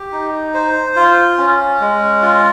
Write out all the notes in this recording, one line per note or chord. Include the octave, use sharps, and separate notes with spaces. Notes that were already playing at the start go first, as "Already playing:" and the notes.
Already playing: G4
D#4
C5
F4
C#4
G#3
F4